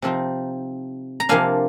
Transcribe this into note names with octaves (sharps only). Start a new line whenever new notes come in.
C3 F3 C4 D#4
A#5
C3 F3 A#3 D4 F5 G#5